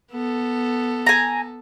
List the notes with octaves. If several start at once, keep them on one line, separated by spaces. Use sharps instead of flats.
B3 A4
G#5 A#5